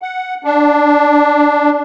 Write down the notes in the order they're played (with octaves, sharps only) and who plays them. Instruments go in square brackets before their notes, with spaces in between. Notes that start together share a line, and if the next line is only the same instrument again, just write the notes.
[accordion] F#5
D4